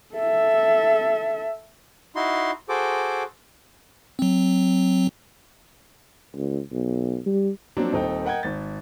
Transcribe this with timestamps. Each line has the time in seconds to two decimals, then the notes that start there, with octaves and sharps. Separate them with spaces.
0.14 A4 E5
2.16 D#4 E4 F#4 C6
2.69 F#4 G#4 A4 C5 D6
4.19 F#3 C4
6.35 C#2
6.72 B1
7.26 G3
7.77 F3 F#3 A#3 C4 D4
7.93 D#1 C4 D#4 A4 G5
8.25 A#4 D#5 F#5 G5 G6 G#6
8.43 G#1 A6